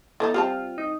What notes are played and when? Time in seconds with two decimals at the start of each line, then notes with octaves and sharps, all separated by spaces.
0.20 E3 B3 D#4 A4
0.34 G3 C4 F4 A5
0.78 D#4